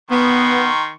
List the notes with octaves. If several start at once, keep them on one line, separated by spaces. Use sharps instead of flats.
D#3 B3 C6 C#6